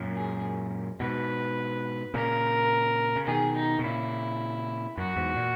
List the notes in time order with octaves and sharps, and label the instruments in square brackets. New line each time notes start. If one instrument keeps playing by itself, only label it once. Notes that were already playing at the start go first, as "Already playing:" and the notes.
Already playing: [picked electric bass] F#2 A#2
[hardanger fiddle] G#4
[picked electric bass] G#2 B2 [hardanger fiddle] B4
[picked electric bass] A#2 C#3 [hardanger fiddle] A#4
[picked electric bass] C#3
[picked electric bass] B2 D#3 [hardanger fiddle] G#4
[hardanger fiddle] D#4
[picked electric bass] B2
[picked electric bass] A#2 C#3 [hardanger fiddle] E4
[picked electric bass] F#2 [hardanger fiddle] F#4
[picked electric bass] E2 G#2
A#2